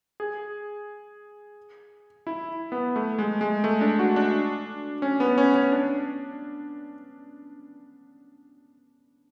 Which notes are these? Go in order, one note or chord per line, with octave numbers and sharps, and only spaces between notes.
G#4
E4
B3
A3
G#3
G#3
A3
D4
F#4
D4
C#4
B3
C#4
C#4
D4